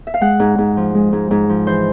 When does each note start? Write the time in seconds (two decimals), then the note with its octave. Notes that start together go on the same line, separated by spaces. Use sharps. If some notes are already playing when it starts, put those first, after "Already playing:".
0.07 E5
0.14 F5
0.21 G#3 F#5
0.40 G#2
0.58 G#2
0.77 F3
0.94 G#3
1.13 G#2
1.31 G#2
1.49 F3
1.67 E3 C5